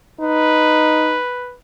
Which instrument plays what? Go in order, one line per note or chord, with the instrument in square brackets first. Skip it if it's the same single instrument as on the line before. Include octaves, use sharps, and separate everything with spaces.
[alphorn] D#4 [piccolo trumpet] B4